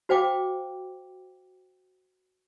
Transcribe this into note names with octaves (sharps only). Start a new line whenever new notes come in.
F#4 C5 F5 G5 D6